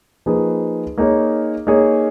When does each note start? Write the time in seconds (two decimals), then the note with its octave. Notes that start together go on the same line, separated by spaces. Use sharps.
0.26 F3 A#3 D#4 G#4 B4
0.98 A#3 D#4 G#4 C#5
1.67 A#3 D#4 G#4 C#5